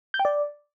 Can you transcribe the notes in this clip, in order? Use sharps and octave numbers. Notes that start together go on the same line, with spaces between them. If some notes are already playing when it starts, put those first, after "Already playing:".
G6
G5
D5